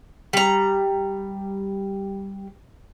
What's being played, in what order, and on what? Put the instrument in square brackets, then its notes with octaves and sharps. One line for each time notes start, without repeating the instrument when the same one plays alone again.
[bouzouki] G3 A#5